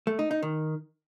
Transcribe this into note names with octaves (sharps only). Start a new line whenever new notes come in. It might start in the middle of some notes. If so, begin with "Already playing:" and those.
A3
D#4
D#4
D#3